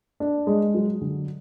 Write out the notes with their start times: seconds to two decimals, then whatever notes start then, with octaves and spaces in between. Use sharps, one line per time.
0.20 D4
0.47 G#3
0.74 F#3
1.01 D3